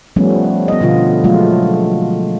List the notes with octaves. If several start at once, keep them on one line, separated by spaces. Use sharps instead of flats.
F3 G3 A3 B3 C#4
B3 D#5
B2 D3 F3 F4
F3 F#3 G#3 A3 F4